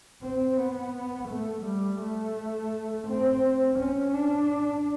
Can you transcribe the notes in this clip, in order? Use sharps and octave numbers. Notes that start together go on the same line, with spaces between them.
C4
B3
A3
G3
A3
C4
C#4
D4